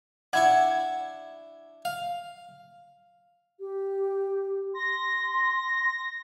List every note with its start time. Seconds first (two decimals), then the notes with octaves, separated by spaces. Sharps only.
0.33 D4 E4 F#5 C#6 G#6
1.85 F5
3.60 G4
4.75 C6 A#6